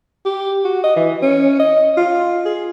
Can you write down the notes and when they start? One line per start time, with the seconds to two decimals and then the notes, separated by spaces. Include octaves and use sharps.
0.25 G4
0.65 F#4
0.84 D#5
0.96 E3
1.22 C#4
1.60 D#5
1.97 F4
2.45 G#4